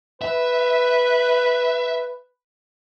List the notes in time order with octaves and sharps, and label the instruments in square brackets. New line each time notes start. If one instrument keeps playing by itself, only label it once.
[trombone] B4 [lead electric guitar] E5